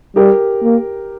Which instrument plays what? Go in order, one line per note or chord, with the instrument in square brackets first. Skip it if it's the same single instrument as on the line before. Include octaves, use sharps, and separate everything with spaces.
[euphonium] G3 [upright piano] G4 A#4
[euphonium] A#3